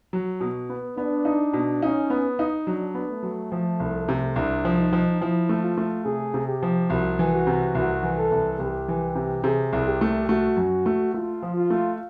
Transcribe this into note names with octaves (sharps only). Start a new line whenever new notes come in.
F#3
B2
B3
B3 D4
D#4
B2
C#4 D#4
B3
D#4
F#3 D4
B3
A3
F#3
F3
C2
C3
C2 D4
F3
D#4
F3
F3 E4
A3
F4
A3
C3 G#4
C3
G4
F3
C2 F#4
E3
F#4
C3
C2 F#4
E3
A4
C2
C2 G4
E3
C3
C3 G#4
C2
G4
A3
A3 F#4
F#2
A3
A3 F4
F3
F4
A3